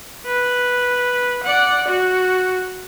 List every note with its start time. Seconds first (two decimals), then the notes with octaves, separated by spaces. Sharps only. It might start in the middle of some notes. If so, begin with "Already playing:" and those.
0.26 B4
1.43 D5 F#5
1.88 F#4